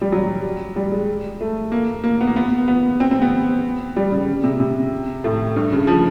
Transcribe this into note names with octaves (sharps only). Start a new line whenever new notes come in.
G3
F#3
G3
G#3
A3
A#3
A#3
B3
A#3
B3
B3
C4
C4
B3
G3
C#3
C#3
C3
C3
A2
G2
C#3
F3